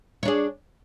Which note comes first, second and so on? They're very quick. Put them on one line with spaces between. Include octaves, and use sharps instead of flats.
C#5 D4 G#4